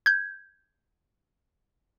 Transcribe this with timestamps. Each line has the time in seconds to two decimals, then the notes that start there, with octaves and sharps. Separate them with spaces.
0.06 G6 G#6